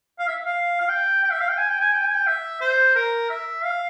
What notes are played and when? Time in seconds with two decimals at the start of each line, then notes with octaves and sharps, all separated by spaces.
0.19 F5
0.27 E5
0.45 F5
0.80 F5
0.89 G5
1.23 G5
1.31 E5
1.40 F5
1.49 G5
1.58 G#5
1.69 G5
1.80 G#5
1.92 G5
2.04 G#5
2.14 G5
2.27 E5
2.61 C5
2.95 A#4
3.30 E5
3.64 F5